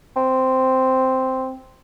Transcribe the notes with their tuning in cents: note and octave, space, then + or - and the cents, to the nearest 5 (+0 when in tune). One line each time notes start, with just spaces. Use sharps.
C4 -5